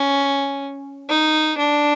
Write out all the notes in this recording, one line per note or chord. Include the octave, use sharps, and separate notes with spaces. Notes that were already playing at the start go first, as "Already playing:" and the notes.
Already playing: C#4
D#4
D4